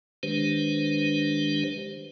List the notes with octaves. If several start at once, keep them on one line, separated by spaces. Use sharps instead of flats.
D#3 G#3 D4 G4 B4 C5